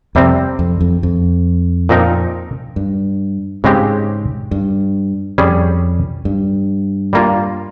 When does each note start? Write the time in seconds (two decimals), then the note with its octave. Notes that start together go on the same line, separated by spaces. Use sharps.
0.15 F2 C3 G3 C4
0.59 F2
0.81 F2
1.03 F2
1.89 A#2 F3 C4 D#4 A#4
2.76 G2
3.64 G#2 C#3 G#3 C4 G4
4.51 G2
5.38 F2 G3 C#4 G#4
6.25 G2
7.13 G3 A#3 F4